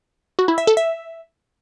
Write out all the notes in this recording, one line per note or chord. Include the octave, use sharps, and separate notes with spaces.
F#4
E4
E5
A4
E5